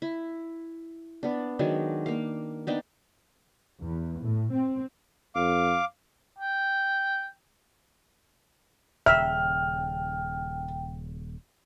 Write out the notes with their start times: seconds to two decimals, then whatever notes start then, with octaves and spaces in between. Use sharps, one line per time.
0.02 E4
1.23 B3 D4
1.59 D#3 F#3 G#3 D4
2.06 A#3 F5
2.67 B3 D4 D#4 G5
3.81 E2
4.22 A2
4.52 C4
5.35 F2 F5 D6
6.39 G5
9.06 D#1 C#3 E5 G5 F6